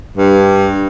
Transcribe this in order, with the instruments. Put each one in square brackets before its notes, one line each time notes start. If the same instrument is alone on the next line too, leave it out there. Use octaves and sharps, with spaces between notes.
[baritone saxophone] G2